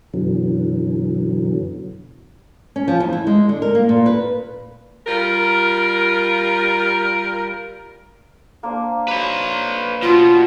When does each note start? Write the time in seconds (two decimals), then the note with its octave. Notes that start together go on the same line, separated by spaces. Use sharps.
0.14 F#2 B2 D3 E3 F#3
2.76 C#4
2.88 F3
3.00 E2
3.13 E4
3.27 G#3
3.49 D3
3.62 A#4
3.75 A#3
3.89 A#2
4.06 B4
5.06 G3 F4 A#4
8.63 A#3 D4 C5
9.08 B4 C#5
10.02 B2 F4